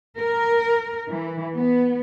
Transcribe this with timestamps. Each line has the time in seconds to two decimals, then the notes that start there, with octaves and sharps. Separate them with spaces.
0.17 A#4
1.09 E3
1.56 B3